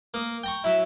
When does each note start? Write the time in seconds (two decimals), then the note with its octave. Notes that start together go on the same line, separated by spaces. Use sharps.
0.14 A#3 D#6
0.43 G5 A#5 C#6
0.64 F#3 E4 E5